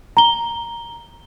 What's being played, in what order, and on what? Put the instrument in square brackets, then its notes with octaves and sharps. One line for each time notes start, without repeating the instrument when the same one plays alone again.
[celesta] A#5 G7